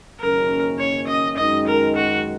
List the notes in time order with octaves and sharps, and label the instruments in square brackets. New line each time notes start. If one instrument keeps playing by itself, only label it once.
[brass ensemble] F#1 F#2 D#3 A#3 C#4 [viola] A#4
[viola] C#5
D#5
[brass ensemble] F#2 D#3 G#3 D#4 [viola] D#5
[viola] A#4
F#4